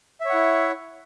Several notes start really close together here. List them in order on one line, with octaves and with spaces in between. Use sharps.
E5 C#5 F#5 E4